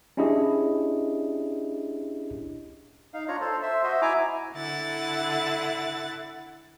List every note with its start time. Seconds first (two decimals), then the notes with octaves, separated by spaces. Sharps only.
0.17 C#4 D4 E4 G4 G#4 D#5
3.14 D#4 F5
3.28 D4 F4 C#5 A#5
3.41 A4 C5
3.62 C5 E5
3.83 F#4 C5 D#5 E5
4.02 E4 G#5 A#5 D6
4.55 D3 E4 F#5 A6